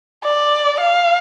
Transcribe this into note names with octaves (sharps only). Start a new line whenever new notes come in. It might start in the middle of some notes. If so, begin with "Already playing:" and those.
D5
F5